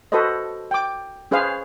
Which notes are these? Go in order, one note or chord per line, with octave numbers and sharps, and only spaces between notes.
F#4 A4 B4 C5 D#5
G5 D6
C#4 G#4 B4 C5 F5